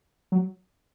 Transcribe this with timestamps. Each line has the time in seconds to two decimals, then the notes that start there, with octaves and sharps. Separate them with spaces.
0.32 F#3